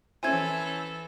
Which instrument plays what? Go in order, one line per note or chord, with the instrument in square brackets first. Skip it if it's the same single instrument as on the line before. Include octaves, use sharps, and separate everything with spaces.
[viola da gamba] E3 A4 [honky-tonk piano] C#4 E4 C5 [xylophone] G#5 G#6